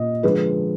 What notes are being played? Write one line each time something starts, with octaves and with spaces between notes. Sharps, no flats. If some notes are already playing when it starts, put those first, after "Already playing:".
Already playing: A#2 D#5
D3 F3 G#3 B4